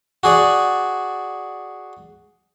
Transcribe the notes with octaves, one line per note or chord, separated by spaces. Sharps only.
F#4 G#4 D5